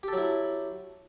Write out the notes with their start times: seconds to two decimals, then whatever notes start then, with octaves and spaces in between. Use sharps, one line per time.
0.03 G4
0.08 A4
0.13 F#3
0.18 E4